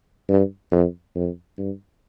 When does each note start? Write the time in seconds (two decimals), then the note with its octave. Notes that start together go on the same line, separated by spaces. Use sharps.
0.29 G2
0.72 F2
1.15 F2
1.58 G2